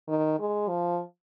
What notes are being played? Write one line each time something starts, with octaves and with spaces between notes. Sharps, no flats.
D#3
G#3
F3